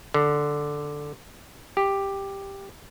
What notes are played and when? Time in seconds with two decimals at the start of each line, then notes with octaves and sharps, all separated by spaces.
0.14 D3
1.77 G4